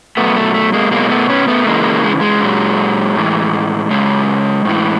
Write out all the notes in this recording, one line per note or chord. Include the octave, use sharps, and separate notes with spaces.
B2 F#3 A3 B3
A3
A3
G#3 A#3
B2 F#3 G#3 A#3
A3 B3
B3 C#4
A3 B3
C#3 E3 G#3 A#3
G#3
G#3
A#2 F#3
A2 E3
C#3 F#3 G#3
A2 E3